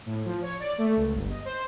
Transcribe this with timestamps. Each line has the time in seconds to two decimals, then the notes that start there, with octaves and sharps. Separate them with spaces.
0.06 A2
0.25 F3
0.42 C#5
0.60 D5
0.78 A3
0.96 C#2
1.14 G1
1.30 D#5
1.45 C5